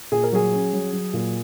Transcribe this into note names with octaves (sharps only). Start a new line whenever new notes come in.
A#2 G#4
A#4
F#3 G#4
C#4
F#3
F#3
A#2